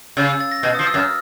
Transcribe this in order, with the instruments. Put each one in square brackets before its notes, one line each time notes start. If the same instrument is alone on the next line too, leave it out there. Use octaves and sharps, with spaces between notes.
[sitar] C#3 [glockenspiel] E6
[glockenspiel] E6
A6
A#6
[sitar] B2 [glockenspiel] A6
[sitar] F3 [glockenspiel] D#6
[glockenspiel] E6
[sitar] F#2
[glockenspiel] F6